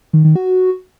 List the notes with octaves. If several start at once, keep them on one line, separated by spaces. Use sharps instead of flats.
D#3
D#3
F#4